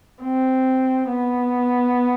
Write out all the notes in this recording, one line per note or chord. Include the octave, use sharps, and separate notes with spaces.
C4
B3